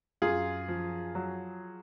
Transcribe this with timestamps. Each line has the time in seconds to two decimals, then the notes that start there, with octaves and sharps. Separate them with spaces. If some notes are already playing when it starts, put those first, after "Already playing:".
0.22 F#2 F4 G#4
0.68 F3
1.15 F#3